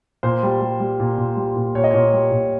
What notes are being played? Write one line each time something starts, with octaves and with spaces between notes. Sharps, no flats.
A#2 C5
G3
G3
G3
A#2
A#2
G3
A#2
A#2 C#5
D#5
A#2 C#5
G3
A#2